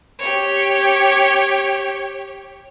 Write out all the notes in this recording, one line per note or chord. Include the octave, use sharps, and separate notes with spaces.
G4 C#5